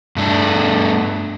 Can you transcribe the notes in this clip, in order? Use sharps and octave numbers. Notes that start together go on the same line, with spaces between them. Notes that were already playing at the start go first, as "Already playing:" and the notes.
G2 A3 D4